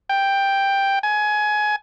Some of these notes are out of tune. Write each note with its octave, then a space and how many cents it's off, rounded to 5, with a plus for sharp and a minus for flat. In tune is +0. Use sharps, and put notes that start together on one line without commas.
G5 +5
G#5 +20